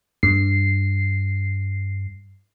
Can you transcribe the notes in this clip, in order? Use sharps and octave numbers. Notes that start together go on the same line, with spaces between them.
G2 C7